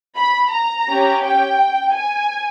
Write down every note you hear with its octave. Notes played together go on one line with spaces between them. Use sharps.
B5
A#5
C#4 G4
G5
G#5